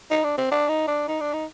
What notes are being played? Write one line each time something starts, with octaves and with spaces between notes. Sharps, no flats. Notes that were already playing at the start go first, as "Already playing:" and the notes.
D#4
D4
C4
D4
D#4
D4
D#4
D4
D#4